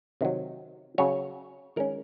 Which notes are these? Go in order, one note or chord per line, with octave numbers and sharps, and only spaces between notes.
C3 D#3 F#3
C#3 F#3 C#4 C#5
D#3 G#3 C#4 A#4